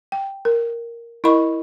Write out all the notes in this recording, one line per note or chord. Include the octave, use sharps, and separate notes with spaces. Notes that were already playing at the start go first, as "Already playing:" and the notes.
G5
A#4
E4 A#4 D#5 B5 C#6